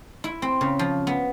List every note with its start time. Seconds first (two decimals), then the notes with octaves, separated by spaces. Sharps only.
0.24 E4
0.42 C4
0.61 C#3
0.79 F3
1.07 B3